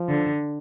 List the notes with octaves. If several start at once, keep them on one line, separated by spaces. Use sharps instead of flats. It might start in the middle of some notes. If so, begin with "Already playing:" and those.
Already playing: F3
D3